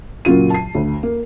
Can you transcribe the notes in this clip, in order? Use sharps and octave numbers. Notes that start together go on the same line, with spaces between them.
A#2 C#3 F#3 F4 D#7
A5 C7
D2
A#3